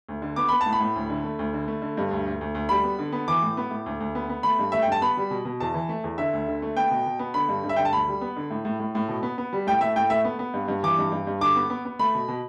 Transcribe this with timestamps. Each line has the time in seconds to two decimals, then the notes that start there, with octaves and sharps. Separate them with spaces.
0.09 D2
0.22 D3
0.36 B3 D6
0.49 B3 B5
0.61 A5
0.66 A2
0.73 B5
0.80 A2
0.96 D2
1.10 D3
1.24 A3
1.39 D2
1.54 D3
1.68 A3
1.82 D3
1.97 G2
2.11 D2
2.26 D2
2.41 D2
2.55 D2
2.69 G3 B5
2.84 B3
2.99 D3
3.13 B3
3.28 E3 D6
3.42 A2
3.57 B3
3.71 A2
3.86 D2
4.00 D2
4.15 B3
4.29 B3
4.43 A3 B5
4.59 G2
4.72 A3 E5
4.82 G5
4.88 G2 A5
5.01 B3 B5
5.17 G3
5.31 B2
5.45 B2
5.60 E2 A5
5.74 E3
5.89 A3
6.04 E2
6.18 D3 E5
6.33 D2
6.48 D3
6.62 A3
6.76 B3 G5
6.91 B2
7.06 B2
7.19 B3
7.34 D3 B5
7.49 G2
7.64 G2
7.69 E5
7.76 D3 G5
7.85 A5
7.92 D2 B5
8.08 G3
8.21 B3
8.36 D3
8.50 A2
8.65 A2
8.80 A2
8.95 A2
9.08 B2
9.23 B3
9.38 B3
9.53 G3
9.67 A2 G5
9.81 A3 E5
9.96 A2 G5
10.10 A3 E5
10.25 B3
10.39 B3
10.54 G2
10.68 G2
10.83 E3 D6
10.98 G2
11.12 G2
11.27 G2
11.41 D3 D6
11.56 B3
11.70 B3
11.85 B3
11.99 A3 B5
12.15 B2
12.28 B2